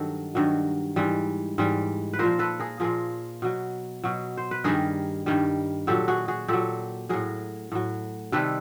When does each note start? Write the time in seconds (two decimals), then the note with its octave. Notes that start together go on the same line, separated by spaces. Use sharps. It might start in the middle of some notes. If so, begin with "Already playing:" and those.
Already playing: G2 D#3 F#3 A4
0.35 G2 D#3 F#3
0.96 G#2 E3 G3
1.58 G#2 E3 G3
2.13 B4
2.19 A#2 F3 A#4 C5
2.39 A4 B4
2.60 G#4 A#4
2.80 A#2 F3 G#4 A#4
3.42 B2 F#3
4.04 B2 F#3
4.37 C5
4.51 B4
4.64 G2 D#3 G3 G#4 A#4
5.26 G2 D#3 G3
5.87 A#2 F#3 G4 A4
6.08 F#4 G#4
6.28 F#4 G#4
6.48 A#2 F#3 G4 A4
7.09 A2 F#3 G#4 A#4
7.72 A2 F#3
8.32 C3 D#3 G3 A4 B4